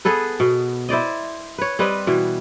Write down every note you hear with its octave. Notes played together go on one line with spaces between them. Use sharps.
B3 G#4 A4 B4
B2
E4 C5 D5 D#5
B4 C#5
G3 C4 B4 D#5
B2 E3